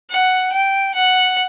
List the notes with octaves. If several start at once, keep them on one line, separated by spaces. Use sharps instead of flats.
F#5
G5
F#5